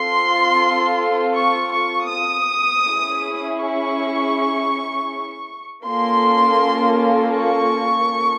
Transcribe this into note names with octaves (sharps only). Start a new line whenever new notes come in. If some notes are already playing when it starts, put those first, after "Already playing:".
Already playing: C4 F4 A4 C6
C#6
C#6
D#6
C#4 E4 G#4
C#6
A#3 C#4 F4 A4 C6
C#6